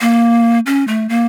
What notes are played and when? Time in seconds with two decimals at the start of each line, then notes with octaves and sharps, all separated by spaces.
0.01 A#3
0.66 C#4
0.88 A3
1.09 A#3